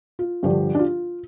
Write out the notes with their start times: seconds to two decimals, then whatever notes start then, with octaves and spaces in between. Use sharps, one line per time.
0.19 F4
0.43 G2 D3 F3 G4
0.75 D4
0.79 F4